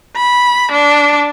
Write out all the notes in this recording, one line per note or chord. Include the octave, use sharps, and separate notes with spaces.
B5
D4